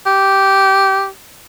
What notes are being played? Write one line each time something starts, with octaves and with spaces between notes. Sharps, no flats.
G4